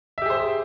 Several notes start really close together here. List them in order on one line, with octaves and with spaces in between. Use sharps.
E5 G4 G#4 C5